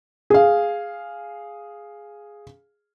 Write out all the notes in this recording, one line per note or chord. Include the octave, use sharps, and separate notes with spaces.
G#4 F5